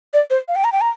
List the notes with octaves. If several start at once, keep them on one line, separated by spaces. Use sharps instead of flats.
D5
C5
F5
G5
A#5
G5
A#5